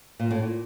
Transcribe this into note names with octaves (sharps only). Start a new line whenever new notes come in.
A#2
A2
A#2